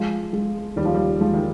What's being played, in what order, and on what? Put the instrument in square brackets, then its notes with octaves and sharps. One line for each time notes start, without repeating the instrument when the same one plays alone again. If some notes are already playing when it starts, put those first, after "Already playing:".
Already playing: [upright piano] F3 [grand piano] G#3
[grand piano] G#3
[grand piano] D#2 [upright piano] G3
[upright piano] F3
G3
[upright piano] F3 [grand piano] G#3
[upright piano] D#3